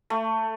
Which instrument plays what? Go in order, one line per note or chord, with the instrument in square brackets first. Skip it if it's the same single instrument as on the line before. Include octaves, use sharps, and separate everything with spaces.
[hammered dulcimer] A3